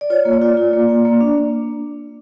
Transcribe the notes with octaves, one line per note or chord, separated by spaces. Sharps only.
D5
F4 C#5
A#3
D5
F4
F4
A#3
A#3
A#3
D4